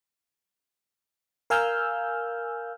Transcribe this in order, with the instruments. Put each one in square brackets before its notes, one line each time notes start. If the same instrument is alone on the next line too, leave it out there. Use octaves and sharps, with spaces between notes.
[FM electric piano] A#4 F5 G#5 E6 F6 G6